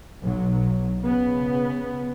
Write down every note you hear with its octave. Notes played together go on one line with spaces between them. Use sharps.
B1 F#3
C#3 B3